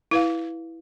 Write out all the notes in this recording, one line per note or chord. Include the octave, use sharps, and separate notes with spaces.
E4 B4 F5